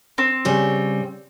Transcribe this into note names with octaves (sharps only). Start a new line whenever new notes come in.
C4
C#3 G3 C#5